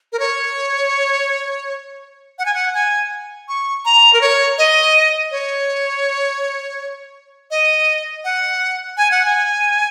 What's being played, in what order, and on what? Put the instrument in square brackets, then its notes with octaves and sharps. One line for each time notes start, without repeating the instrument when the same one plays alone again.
[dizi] A#4
C#5
F#5
G#5
F#5
G#5
C#6
A#5
A#4
C#5
D#5
C#5
D#5
F#5
G#5
F#5
G#5